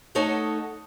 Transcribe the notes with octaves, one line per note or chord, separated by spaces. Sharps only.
A3 D#4 A4 C#5 D#5 F#5